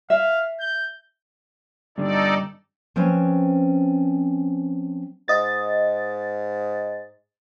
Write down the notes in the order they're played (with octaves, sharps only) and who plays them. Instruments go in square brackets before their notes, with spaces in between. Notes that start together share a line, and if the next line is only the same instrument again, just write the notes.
[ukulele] E5 [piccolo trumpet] F5
[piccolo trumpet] G6
[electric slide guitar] G2 D3 [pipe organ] D#4 A4 D5
[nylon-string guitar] F3 C4 C#4 B4 C#5
[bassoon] G#2 [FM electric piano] D#5 A6